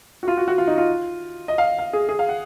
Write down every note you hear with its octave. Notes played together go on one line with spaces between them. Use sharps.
F#4
F4
F#4
F#4
F4
D#4
F4
D#5
F5
F5
G#4
G#4
F5
F#5